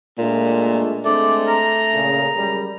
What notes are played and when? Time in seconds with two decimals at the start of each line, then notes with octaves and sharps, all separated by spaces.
0.18 A#2 G#3 A3 D4
1.05 G#3 A3 C4 D4 D5
1.47 A#5
1.94 A#2 C#3
2.34 F#2 G3 G#3